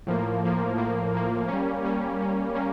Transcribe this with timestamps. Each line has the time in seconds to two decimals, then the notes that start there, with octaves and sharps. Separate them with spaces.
0.07 A2 F3 A#3
0.43 A2 F3 A#3
0.77 A2 F3 A#3
1.13 A2 F3 A#3
1.48 G3 A#3 C#4
1.84 G3 A#3 C#4
2.20 G3 A#3 C#4
2.55 G3 A#3 C#4